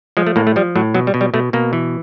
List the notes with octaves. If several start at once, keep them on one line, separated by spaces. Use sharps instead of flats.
F3 G#3
A3
A2 A#3
A3
F3 G3
A2 F#3
B2 F#3
G3
B2
G3
B2 A3
B2 A#3
E3